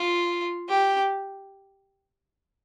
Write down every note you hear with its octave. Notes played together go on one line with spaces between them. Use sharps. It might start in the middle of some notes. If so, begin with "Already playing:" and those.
Already playing: F4
G4